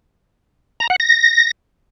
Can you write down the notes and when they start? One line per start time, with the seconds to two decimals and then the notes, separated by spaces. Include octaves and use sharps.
0.80 A#5
0.90 F#5
1.00 A#6